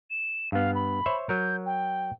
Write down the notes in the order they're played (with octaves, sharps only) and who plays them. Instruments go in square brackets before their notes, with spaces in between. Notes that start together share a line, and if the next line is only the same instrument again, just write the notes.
[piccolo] E7
[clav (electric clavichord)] G2 B3 [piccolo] F5
[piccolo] B5
[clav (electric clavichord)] C5 C#5 E5
[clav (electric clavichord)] F#3 A#4 [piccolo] G6
[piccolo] G5